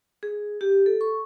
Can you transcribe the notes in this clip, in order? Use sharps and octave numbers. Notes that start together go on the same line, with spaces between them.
G#4
G4
A4
C#6